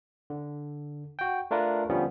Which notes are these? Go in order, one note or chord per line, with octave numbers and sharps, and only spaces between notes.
D3
F#4 G5
A3 D4 F4 A#4 B4
D3 F3 G3 B3 C#4